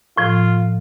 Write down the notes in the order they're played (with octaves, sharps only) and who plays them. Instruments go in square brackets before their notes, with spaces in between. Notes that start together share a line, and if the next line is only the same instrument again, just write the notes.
[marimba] A2 F3 [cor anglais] F4